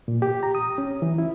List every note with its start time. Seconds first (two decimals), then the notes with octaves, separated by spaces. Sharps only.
0.08 A#2
0.22 G4
0.43 A#5
0.55 D#6
0.78 C#4
1.02 E3
1.18 E4